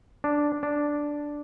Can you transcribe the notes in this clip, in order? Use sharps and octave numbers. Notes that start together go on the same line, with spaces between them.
D4
D4